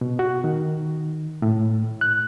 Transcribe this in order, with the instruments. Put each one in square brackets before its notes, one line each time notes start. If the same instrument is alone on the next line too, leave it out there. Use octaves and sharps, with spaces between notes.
[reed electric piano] B2
F#4
D#3
A2
F#6